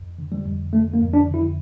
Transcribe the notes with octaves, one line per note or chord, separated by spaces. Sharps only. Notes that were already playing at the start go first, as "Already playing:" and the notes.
Already playing: F2
D3
G3
F2
D3 A3
A#3
F2
D4
D3
E4